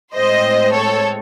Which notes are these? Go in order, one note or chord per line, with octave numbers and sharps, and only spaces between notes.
A2 G#3 C4 C5 D#5
A4 C#5